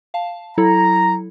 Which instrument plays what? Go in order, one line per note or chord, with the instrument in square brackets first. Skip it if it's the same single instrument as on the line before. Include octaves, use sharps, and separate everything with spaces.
[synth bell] F5 A5
[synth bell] F#3 E4 A4 [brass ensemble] A#5